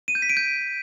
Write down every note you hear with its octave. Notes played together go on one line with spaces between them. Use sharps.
D#7
G6
B6
D7
G6